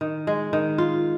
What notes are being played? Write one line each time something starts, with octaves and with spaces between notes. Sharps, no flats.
D#3
G#3
D#3
F4